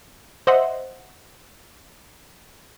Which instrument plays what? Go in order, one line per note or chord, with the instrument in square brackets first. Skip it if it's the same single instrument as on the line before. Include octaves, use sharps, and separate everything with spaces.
[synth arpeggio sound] C5 D#5 E5 F#5 C6